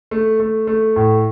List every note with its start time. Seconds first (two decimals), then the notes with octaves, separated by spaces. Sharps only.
0.11 A3
0.40 A3
0.67 A3
0.96 A2